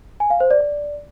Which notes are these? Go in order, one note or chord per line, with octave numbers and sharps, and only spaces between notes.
G#5
F5
C5
D5
D5